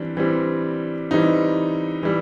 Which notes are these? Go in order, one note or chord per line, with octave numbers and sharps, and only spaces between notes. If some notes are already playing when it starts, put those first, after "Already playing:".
Already playing: E3 G3 C4 D4
E3 G3 C4
E3 G3 C4 D#4
E3 G3